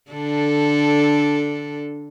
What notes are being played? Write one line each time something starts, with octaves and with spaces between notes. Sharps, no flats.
D3 D4 A4